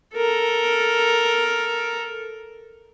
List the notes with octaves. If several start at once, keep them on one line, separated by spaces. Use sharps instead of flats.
A4 A#4